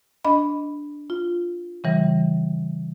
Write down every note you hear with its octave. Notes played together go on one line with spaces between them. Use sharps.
D4 D#5 B5
F4
C#3 E3 G3